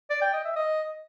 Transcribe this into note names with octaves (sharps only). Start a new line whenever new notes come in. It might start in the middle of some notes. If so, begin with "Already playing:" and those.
D5
G5
D#5
E5
D#5